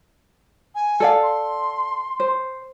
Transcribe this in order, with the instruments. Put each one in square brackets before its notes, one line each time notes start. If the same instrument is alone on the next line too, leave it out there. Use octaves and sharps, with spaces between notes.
[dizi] G#5
[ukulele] A4 D5 F5
[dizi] C6
[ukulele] C5